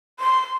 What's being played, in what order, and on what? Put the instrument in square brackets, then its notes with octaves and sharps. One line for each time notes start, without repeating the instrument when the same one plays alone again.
[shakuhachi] C6